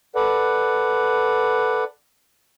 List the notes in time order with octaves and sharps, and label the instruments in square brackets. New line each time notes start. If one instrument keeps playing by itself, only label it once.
[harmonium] A4 B4 D5 F#5